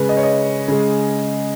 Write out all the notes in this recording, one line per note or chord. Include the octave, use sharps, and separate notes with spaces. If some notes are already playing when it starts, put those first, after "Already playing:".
Already playing: C#3 G#3 B4
D#5
C#5
D#5
C#3 G#3